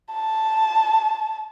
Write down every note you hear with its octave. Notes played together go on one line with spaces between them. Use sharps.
A5